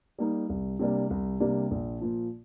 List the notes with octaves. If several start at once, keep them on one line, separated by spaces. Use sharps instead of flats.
G3 A#3 D#4
C2
C3 G3 A#3 D4
C2
C3 G3 A#3 D4
A#1
A#2 F3